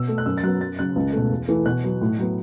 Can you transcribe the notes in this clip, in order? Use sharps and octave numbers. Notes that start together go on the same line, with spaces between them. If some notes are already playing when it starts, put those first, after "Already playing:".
Already playing: B2 E6
A3
F#6
F#2 E6
A6
F#3 B3 F#6
F#2 A6
C#3 F#3 F#6
C#2
B2 A3
E2
E3 A3
B2 F#6
F#3 B3
A2
F#3 B3